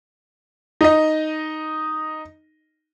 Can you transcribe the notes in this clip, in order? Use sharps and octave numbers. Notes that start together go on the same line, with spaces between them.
D#4 D#5